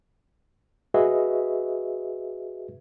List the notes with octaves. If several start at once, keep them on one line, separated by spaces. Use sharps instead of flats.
F#4 G#4 B4 D#5 E5